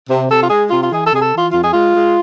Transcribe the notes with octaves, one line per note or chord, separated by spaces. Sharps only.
C3
C3 A4
F4
G#3 G#4
C3 F4
F4
E3 G#4
A4
C3 G#4
A4
E3
F4
F2 F4
G#4
G#3 F4
G#3